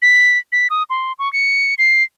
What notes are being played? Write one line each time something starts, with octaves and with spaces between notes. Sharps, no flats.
B6
B6
D#6
C6
C#6
C#7
C7